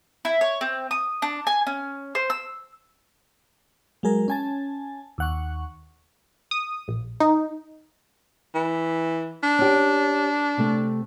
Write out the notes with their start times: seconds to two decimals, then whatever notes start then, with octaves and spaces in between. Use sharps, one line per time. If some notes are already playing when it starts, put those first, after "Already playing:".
0.25 E4
0.41 C#5
0.61 C4
0.91 D#6
1.22 D4
1.47 G#5
1.67 C#4
2.15 C5
2.30 E6
4.03 F#3 G#3 G#4 A#4
4.28 C#4 G#5 A5
5.18 D#2 F#5 C#6
6.51 D#6
6.88 A#1
7.20 D#4
8.55 E3
9.43 D4
9.59 C#4 G4
10.57 C3 A3